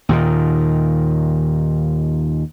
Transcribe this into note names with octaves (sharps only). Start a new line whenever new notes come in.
D#2 A#2 D#3